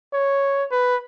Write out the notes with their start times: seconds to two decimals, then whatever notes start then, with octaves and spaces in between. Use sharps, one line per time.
0.14 C#5
0.71 B4